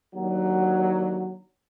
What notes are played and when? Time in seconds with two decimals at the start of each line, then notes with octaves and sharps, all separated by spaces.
0.14 D#2 D3 F#3